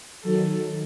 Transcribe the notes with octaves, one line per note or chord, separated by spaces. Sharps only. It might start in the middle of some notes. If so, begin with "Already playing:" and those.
D#3 F#3 A4